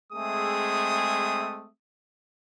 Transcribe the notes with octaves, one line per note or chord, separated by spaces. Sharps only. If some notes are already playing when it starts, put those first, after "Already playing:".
G#3 A3 C4 G#4 E5 D#6